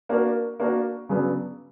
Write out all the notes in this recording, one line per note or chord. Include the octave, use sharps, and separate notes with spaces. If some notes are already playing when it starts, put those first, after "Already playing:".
A#3 D4 F#4 A#4
A#3 D4 F#4 A#4
C#3 F#3 B3 D4